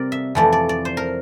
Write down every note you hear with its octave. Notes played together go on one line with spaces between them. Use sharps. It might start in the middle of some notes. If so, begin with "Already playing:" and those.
Already playing: C3 G3 C4 A#4 D5
E5
F2 E3 A3 D5
D5
D5
C5
A#4